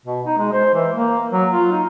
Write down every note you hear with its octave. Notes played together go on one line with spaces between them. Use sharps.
B2
D#4
G#3
C5
E3
A#3
F#3
F4
D#4